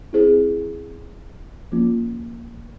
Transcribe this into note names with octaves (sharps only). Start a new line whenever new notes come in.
C4 E4 G#4 C5
F3 A#3 C#4 F4